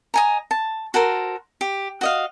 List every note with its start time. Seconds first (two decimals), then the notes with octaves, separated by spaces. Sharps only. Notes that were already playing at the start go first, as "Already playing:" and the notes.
0.14 D#5 G#5 A#5
0.51 A5
0.94 F#4 A4 A#4 C5
1.61 G4
2.01 F#4 D#5 F5